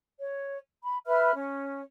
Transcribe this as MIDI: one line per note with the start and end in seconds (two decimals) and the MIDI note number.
0.19 0.57 73
0.82 0.97 83
1.07 1.31 71
1.07 1.31 76
1.07 1.31 83
1.07 1.31 89
1.34 1.82 61